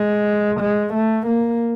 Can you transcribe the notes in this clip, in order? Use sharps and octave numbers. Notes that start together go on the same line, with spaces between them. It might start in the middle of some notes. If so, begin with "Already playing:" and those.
Already playing: G#3
G#3
A3
A#3